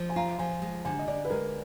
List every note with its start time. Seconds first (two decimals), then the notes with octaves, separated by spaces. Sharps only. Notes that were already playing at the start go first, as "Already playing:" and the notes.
Already playing: F3
0.09 G#5
0.16 F4 A#5
0.39 F3 G#5
0.62 G#3
0.85 D3 G#5
0.99 D#5
1.08 D3 D5
1.25 B4
1.30 G#3 A#4